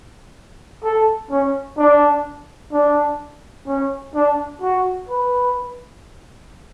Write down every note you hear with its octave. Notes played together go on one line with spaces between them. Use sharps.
A4
C#4
D4
D4
C#4
D4
F#4
B4